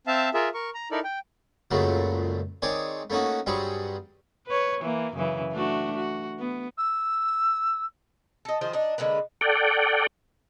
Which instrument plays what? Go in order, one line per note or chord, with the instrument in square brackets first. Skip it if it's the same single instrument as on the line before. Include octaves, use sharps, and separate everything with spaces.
[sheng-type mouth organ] C4 E5 F5 A5
F4 G#4 A#4 E5
A#4 C#6
A#5
D#4 E4 A4 A#4 D5
G5
[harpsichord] C#2 F#2 A#2 C#3 F#3 A3
D#3 C4 G#4 C#5 D5
A3 A#3 C#4 D#4 F#4
G2 F#3 G3 C4 G#4 C#6
[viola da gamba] B4 C#5
E3 A#3
F#2 C#3 E3
A3 D4 F#4
F#4
B3
[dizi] E6
[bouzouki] A4 D#5
D#3 F3 G#4 C5
D4 D#4
D3 G#3 A#3 B4
[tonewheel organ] A4 D5 F#5 G5